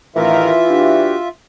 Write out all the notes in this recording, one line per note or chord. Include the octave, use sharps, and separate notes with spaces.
A1 D#3 E3 F4 A#4 E5
D4 F#4 G4